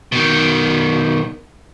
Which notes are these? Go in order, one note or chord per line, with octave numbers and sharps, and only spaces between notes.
B2 D#3